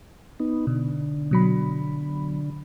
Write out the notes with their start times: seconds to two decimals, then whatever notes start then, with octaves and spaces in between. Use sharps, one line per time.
0.40 B3 D#4
0.67 B2 D3
1.31 B2 F#3 B5